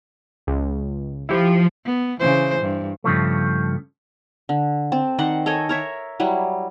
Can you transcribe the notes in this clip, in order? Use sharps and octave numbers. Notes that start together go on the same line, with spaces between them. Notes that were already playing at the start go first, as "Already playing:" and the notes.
C#2
F3 E4 G4
B3
C#3 E3 C5
G2
G2 C#3 F3 A3
D3
C4 A5
D#3 C5 D5 F#5
A4 C#5 D#5 G#5
A#4 C#5 E5
F#3 G3 E4